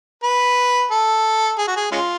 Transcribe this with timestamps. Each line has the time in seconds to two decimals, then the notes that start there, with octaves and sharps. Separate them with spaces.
0.23 B4
0.91 A4
1.58 G#4
1.67 F#4
1.76 G#4
1.92 G#3 C#4 F4